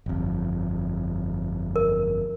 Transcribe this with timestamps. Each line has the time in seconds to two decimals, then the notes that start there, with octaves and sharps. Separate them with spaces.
0.06 G1 F2
1.76 A#4